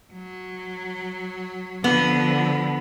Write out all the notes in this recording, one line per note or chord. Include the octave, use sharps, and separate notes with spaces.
F#3
D3 F3 B3